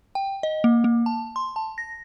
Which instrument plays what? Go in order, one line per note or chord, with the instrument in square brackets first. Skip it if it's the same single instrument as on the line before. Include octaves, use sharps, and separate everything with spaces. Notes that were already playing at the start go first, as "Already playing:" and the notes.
[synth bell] G5
D#5
A#3
A#3
A5
C6
A5
A#6